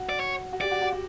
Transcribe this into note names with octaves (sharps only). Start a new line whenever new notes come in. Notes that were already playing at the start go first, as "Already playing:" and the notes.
Already playing: F#4
D5
C#5
F#4
G4 D5
F#4
F#4
F#4